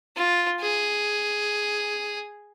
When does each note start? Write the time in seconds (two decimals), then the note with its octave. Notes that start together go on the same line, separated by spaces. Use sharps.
0.17 F4
0.60 G#4